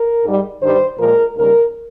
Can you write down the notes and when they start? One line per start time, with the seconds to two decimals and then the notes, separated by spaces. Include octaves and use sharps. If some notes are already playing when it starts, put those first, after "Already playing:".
Already playing: A#4
0.24 G#2 G3
0.61 G2 D#3 G3 C5
0.98 A#2 F3 G#3 A#4
1.36 D#2 C#3 G3 A#4